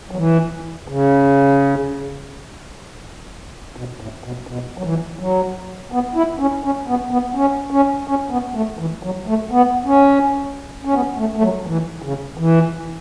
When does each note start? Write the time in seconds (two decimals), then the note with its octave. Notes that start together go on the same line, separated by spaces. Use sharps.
0.11 F#3
0.16 E3
0.88 C#3
3.76 B2
4.00 A2
4.24 B2
4.47 B2
4.78 F#3
4.83 E3
5.19 F#3
5.92 B3
6.15 E4
6.39 C#4
6.64 C#4
6.88 B3
7.11 B3
7.35 C#4
7.70 C#4
8.08 C#4
8.30 B3
8.55 A3
8.79 E3
9.03 F#3
9.27 A3
9.51 B3
9.86 C#4
10.85 C#4
10.94 B3
11.18 A3
11.36 A3
11.42 F#3
11.67 E3
12.02 C#3
12.38 E3